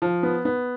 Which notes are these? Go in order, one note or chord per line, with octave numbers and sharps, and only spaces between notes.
F3
B3
B3